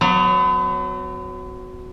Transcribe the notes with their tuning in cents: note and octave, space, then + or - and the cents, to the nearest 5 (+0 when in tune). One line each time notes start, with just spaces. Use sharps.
F#3 -5 B3 +40